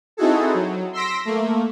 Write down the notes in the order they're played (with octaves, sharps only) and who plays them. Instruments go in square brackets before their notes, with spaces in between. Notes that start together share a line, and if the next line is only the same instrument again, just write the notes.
[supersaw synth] C4 D#4 E4 F#4 G#4 A4
F#3
C6 E6 A#6 B6 D7
A3 A#3